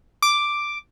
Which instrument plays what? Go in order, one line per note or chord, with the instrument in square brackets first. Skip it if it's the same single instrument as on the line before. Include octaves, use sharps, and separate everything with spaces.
[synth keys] D6